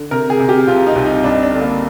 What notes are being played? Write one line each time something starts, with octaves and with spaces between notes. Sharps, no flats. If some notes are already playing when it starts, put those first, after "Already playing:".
Already playing: D3
C3 A#4
G#4
C3
G4
C2 F4
D#4
C2
D#4
G2 D4
D4
D3
A#3